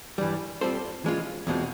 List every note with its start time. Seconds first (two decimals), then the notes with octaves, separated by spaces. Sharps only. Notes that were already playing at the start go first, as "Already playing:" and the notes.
0.18 G2 E3 G3
0.61 G3 C4 F4 A4 C5
1.04 E3 G#3 C#4 F4
1.47 E2 B2 G#3 C4 F4